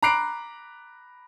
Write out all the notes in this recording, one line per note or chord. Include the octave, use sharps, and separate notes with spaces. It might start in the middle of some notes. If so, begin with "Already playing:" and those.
A#5 B5 D6 F#6 C7 D7